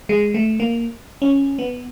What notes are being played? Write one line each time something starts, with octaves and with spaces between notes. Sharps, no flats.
G#3
A3
A#3
C#4
B3